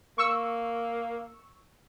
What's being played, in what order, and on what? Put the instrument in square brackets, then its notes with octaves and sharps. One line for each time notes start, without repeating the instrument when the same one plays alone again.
[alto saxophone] A#3 [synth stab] C#6 E6